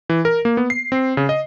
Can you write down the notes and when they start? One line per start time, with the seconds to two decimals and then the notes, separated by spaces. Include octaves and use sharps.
0.09 E3
0.25 A#4
0.45 A#3
0.57 B3
0.70 C7
0.92 C4
1.17 C#3
1.29 D#5